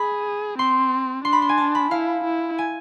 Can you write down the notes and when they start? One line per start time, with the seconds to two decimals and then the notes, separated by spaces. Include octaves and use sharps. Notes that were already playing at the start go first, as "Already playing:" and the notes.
Already playing: G#4 B5
0.59 C4 C6
1.25 D4 C6
1.33 B5
1.42 C6
1.49 G#5
1.58 A5
1.75 B5
1.91 E4 F5
2.24 E4
2.58 G#5